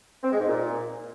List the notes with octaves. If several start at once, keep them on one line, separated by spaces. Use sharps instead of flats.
C4
G#3
G#2
A#2